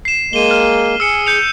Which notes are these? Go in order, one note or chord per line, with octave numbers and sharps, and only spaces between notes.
C7 E7
G#3 A#3 D#7 G7
F6
G#4 E6 C#7
G6 C#7 F7